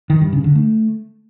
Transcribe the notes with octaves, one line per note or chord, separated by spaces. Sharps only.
D#3
G2
C#3
D3
A3